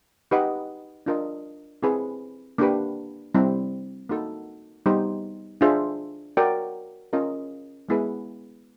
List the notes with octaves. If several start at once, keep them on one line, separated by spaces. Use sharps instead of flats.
D#4 G4 B4 D#5 F#5
D4 F4 A#4 D#5
C4 E4 G#4 B4
A#3 D4 G4 B4
G3 C4 E4
A#3 D#4 F#4 A4
G3 B3 D#4 G4 C5
D4 F4 G#4 C5 E5
F#4 A#4 D5 G5
C#4 F4 A#4 D#5
G#3 B3 E4 G#4 B4